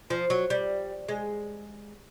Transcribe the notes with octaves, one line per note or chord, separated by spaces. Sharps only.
F3
F#3
G3
G#3